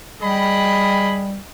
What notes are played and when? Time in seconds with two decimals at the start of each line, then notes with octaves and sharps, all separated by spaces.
0.22 G3 G#4 D#5 G5 B5